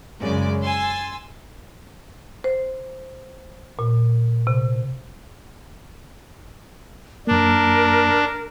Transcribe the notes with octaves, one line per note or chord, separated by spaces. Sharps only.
F#2 C#3 G#3 D5
G#5 C6 E6 A6
C5
A#2
C3
F#2 A#3 D4 A#4